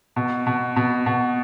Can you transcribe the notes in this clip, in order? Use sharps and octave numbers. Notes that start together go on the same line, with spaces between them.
B2
B2
B2
B2